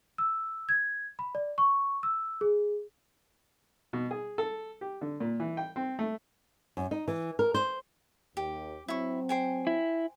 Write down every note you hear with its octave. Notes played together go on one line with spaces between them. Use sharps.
E6
G#6
B5
D5
C#6
E6
G#4
B2
G#4
A4
G4
D3
A#2
E3
G5
C4
A3
F#2
D#4
E3
A#4
C5
D#2 G4
F#3 C4 E4 C#6
C5 G5 G#5
E4